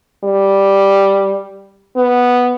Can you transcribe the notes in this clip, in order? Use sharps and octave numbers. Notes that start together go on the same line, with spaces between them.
G3
B3